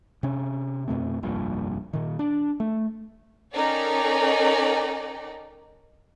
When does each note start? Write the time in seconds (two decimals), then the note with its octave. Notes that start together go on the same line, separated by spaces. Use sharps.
0.23 C3 C#4
0.88 F2 B2 A3 C4
1.23 F1 A#1 G2 A#2
1.93 A#2 D#3
2.19 D4
2.60 A3
3.54 C#4 D#4 A4 A#4 D5 G5